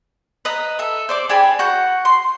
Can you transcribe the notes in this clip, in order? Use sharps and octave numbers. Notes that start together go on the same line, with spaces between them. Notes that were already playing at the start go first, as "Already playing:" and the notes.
B4 D#5 A#5
A4 E5
C5 D5 D6
D4 G#4 G5 B5
F#4 F#5 G6
C6